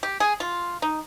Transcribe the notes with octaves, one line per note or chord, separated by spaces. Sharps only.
G4
G#4
F4
D#4